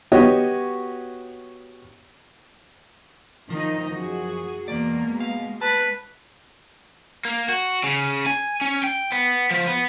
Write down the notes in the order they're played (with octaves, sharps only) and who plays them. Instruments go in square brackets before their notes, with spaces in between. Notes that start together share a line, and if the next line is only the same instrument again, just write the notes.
[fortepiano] B3 F#4 G4 C#5 D#5
[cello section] D#3 D#4 D#5 [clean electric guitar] F3
[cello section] F#2 F#4 G#4
[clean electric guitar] E2 D5 [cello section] B2 G#3 [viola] A#3
[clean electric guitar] F5
[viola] B4 [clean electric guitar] A5
[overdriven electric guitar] A#3
F#4
C#3
G#5
C#4
G5
B3
F3
B3